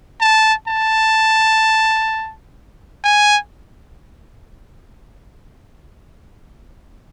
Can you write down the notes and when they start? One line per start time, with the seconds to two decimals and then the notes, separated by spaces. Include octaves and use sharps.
0.21 A5
0.68 A5
3.04 G#5